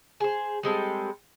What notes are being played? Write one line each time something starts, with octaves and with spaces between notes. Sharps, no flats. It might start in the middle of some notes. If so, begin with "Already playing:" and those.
G#4 C5
G3 G#3 C4 A4